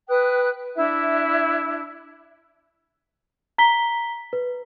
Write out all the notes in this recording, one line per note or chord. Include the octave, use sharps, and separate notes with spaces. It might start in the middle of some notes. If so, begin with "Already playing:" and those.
B4 G5 D#6 F#6
D4 E4 E5
A#5 B6 G7
B4